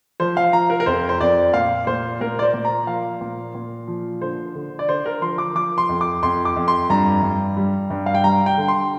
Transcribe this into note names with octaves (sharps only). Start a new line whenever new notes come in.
F3 C5
F5
F3 A#5
A#4
A#4
F2 C5
C5
F2 D5
A#2 F5
A#2 C5
A#2 A#4
D5
C5
A#2
A#5
F3 F5
A#2
A#2
F3
D3 C5
D3
D5
D3 C5
A#4
F3 C6
D6
F3 D6
C6
F2
D6
F2 C6
D6
F2
C6
G2 A#5
G2
G3
G2
F5
G5
G3 A#5
G5
D3
C6